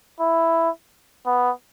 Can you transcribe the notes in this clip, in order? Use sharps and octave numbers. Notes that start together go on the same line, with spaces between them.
E4
B3